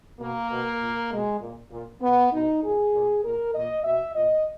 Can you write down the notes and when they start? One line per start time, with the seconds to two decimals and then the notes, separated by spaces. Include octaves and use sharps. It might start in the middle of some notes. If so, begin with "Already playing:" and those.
0.20 B2 A#3
0.51 B2
0.81 A#2
1.11 B2 G#3
1.41 A#2
1.72 A#2
2.02 B2 B3
2.33 B2 D#4
2.64 A#2 G#4
2.93 A#2
3.24 A#2 A#4
3.55 A#2 D#5
3.84 B2 E5
4.15 A#2 D#5